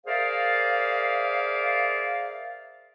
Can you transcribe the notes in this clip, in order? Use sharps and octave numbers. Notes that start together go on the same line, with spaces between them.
G#4 A#4 C5 D5 E5 F5